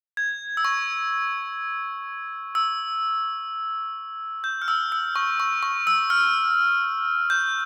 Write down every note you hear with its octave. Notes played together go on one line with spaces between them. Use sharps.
G#6
E6
C#6
E6
G6
F6
E6
E6
C#6
C#6
C#6
E6
F6
G6